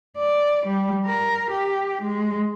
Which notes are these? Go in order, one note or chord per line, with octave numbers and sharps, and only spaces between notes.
D5
G3
A#4
G4
G#3